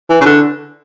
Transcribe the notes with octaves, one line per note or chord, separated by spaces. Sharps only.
E3
C#3
D3